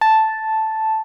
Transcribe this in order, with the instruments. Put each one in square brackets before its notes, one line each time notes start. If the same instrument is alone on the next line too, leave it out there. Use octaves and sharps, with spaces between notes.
[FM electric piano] A5